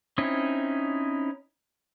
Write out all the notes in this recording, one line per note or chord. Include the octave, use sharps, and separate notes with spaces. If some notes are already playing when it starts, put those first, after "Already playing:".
C4 C#4 D#4 E4